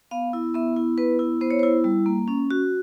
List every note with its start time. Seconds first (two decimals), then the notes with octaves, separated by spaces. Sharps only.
0.11 B3 F5
0.33 E4
0.54 B3 E5
0.77 E4
0.98 B3 B4
1.19 E4
1.41 B3 C5
1.51 C#5
1.59 C5
1.63 E4
1.84 G3
2.06 A#3
2.28 C#4
2.51 F#4